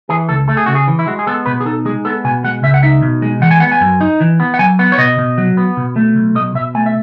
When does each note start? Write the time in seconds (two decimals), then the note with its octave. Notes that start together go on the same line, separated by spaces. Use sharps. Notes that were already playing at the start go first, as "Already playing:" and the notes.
0.09 E3 G#4
0.29 C#2 A4
0.48 A3 A4
0.57 G#4
0.66 C#3 F#4
0.75 G#4
0.88 E3
0.99 E4
1.07 G#3 F#4
1.19 G#4
1.27 B3 A4
1.46 B2 B4
1.61 G#4
1.65 D#4 A4
1.85 G#3 G#4
2.05 B3 A4
2.24 B2 G#5
2.44 G#3 F#5
2.63 C#2 E5
2.74 F#5
2.83 D#4 E5
3.02 B2
3.22 G#3
3.41 E3 F#5
3.51 G#5
3.60 B3 F#5
3.72 G#5
3.81 F#2
4.01 D#4
4.20 E3
4.40 B3
4.54 F#5
4.59 F#3 G#5
4.79 B3 F#5
4.92 C#5
4.98 B2 D#5
5.18 B2
5.38 F#3
5.57 B3
5.77 B2
5.96 A3
6.16 B1
6.35 B1 D#5
6.54 B2 E5
6.75 A3 G#5
6.86 E5